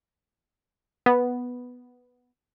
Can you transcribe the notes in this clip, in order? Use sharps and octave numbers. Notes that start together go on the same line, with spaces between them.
B3